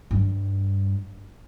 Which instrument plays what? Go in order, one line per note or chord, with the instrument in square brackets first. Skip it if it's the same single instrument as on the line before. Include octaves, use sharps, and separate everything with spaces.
[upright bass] G2